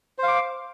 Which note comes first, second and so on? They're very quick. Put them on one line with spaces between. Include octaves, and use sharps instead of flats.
C5 F5 D6